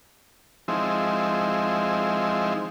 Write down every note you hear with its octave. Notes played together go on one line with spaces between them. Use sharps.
F3 G#3 C4 D#4 E4